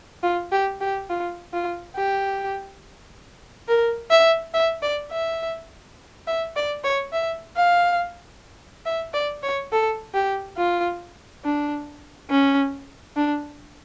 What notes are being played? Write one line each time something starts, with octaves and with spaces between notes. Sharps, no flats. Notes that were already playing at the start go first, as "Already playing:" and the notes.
F4
G4
G4
F4
F4
G4
A#4
E5
E5
D5
E5
E5
D5
C#5
E5
F5
E5
D5
C#5
A4
G4
F4
D4
C#4
D4